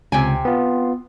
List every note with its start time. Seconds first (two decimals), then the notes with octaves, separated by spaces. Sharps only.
0.12 C#2 C3 G5 G#5
0.45 B3 F4